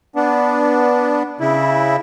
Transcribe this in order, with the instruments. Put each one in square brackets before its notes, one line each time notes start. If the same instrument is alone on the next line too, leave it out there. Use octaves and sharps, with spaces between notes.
[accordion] B3 D4
C#3 E4